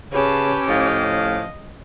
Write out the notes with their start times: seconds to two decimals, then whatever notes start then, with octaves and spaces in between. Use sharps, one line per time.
0.11 C#3 C#4 G4 B4 A5
0.68 A2 F3 D#5 F5